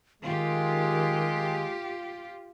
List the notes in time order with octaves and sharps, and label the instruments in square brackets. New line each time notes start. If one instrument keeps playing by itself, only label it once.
[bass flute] D#3 [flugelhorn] G#3 [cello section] F4 G4